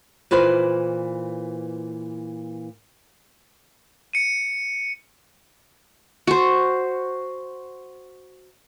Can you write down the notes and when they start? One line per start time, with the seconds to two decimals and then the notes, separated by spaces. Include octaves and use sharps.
0.31 A#2 E3 B4 C5
4.13 C#7 D#7
6.27 F#4 C5